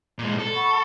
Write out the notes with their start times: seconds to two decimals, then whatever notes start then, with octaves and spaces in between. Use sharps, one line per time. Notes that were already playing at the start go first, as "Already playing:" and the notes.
0.19 A#2 G#3
0.39 A4
0.53 F#5 B5 C#6